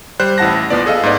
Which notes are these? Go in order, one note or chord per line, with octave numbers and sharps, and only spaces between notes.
G3 C5 F#6
A1 E4 F#5 A5 A#6
A#1 F3 B3 D5
G#4 A4 D#5 F5
G#2 B3 D5